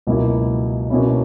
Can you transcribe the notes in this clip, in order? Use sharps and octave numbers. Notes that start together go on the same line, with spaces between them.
C#2 B2 F#3 A#3 E4
B2 A#3 C#4 E4